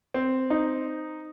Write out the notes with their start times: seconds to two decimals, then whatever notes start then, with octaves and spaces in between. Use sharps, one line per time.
0.14 C4
0.50 D#4